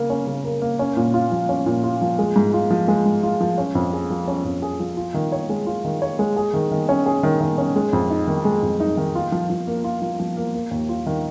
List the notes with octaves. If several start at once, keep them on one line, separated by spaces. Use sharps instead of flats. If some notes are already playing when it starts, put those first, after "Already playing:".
Already playing: C#3 A#3 A#4
C#4
C#3
A#4
A#3
C#4
A#2
F4
F3
C#4
A#2
F4
F3
G#3
G#2
F4
F3
G#3
G#2
F4
F3
C#4
F2
G#4
F3
C#4
F2
G#4
F3
F4
D#3
C#5
G#3
F4
D#3
C#5
G#3
G#4
D#3
D#3
C#4
G#4
D#3
D#3
C#4
G#3
F2
D#4
D#3
G#3
F2
D#4
D#3
F4
F3
F3
A#3
F4
F3
F3
A#3
A#3
D#2
F4
D#3